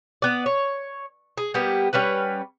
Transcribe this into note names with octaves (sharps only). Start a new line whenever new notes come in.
B3 D5
C#5
G#4
G3 A#3 B3 G4
G3 C#4 B4 F#5